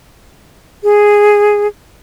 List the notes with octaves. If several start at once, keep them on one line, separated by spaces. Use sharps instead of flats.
G#4